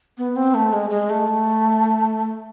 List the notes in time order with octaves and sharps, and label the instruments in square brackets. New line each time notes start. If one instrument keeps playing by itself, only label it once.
[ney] B3
C4
A3
G#3
G#3
A3